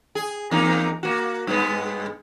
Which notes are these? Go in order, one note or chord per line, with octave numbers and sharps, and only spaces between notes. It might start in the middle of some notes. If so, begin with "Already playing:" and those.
G#4
E2 A#3 D#4
A#3 F#4
G2 G#3 B3